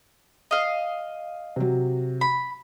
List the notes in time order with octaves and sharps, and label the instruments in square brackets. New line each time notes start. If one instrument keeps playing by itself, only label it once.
[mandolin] D#5 F5
[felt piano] C3 F#3
[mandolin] B5